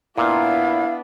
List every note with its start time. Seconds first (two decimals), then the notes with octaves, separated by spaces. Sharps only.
0.18 A#2 B3 D4 E4 F5